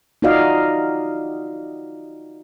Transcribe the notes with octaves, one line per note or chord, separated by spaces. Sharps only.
D#4 F4 F#4 D5 D#5 F5